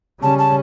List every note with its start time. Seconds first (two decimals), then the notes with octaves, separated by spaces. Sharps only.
0.22 C#3 G3 C#4 A5
0.39 A5